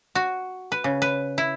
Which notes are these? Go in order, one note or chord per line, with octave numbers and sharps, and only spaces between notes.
F#4
B4
C#3
B4
E4